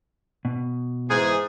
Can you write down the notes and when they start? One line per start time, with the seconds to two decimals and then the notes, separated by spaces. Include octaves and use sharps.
0.45 B2
1.10 G#2 E3 G#4